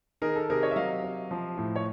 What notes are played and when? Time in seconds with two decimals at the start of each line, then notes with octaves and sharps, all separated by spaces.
0.22 D#3 G#4 A#4
0.35 A4
0.50 C3 G#4 A#4
0.62 C#5 D#5
0.71 E5
0.76 F#3 D#5 F5
1.03 C3
1.31 F3
1.58 A2
1.76 C#5